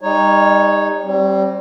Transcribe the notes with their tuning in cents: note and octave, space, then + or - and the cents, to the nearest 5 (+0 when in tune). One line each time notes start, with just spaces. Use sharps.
G3 +35 D#4 +0 C#5 +0
G3 -20 C4 +25